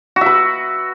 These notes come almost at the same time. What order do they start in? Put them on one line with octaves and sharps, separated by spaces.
F#4 E5 B4